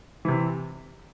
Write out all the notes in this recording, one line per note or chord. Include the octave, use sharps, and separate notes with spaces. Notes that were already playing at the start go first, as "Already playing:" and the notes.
C3 E3